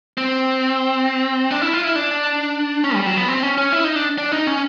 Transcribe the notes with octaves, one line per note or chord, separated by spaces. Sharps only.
C4
D4
E4
F4
E4
D4
C#4
G3
F#3
B3
C4
C#4
C#4
E4
D#4
D4
D4
D#4
C#4